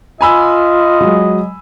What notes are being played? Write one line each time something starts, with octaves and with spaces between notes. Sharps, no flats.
F4 D#5 G#5 B5 E6
F#3 G#3